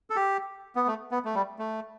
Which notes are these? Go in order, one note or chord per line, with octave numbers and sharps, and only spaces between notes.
A4
G4
B3
A3
B3
A3
G3
A3